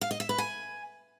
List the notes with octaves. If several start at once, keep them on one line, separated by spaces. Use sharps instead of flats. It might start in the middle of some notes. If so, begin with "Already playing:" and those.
F5
D#5
E5
B4
G#5